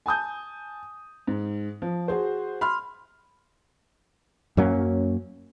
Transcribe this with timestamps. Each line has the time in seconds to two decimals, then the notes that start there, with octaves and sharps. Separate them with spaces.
0.06 G#5 A5 D#6 G6
1.27 G#2
1.82 F3
2.08 F#4 G#4 C5
2.61 B5 C6 F6
4.57 F#2 F#3 A#3 C#4